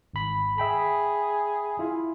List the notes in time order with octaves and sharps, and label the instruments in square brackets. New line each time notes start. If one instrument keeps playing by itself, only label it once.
[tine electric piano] G#1 B5
[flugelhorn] G#4 [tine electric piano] E5 G5 B5
[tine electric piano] E4 F4